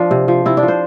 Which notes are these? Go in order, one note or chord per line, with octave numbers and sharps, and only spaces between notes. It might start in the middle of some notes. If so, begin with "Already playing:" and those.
Already playing: F3 D4
C3
F3
C3 E4
D4
F3
C5